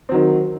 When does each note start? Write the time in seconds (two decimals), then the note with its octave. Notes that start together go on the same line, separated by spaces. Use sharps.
0.09 C4
0.12 F#3
0.14 D#3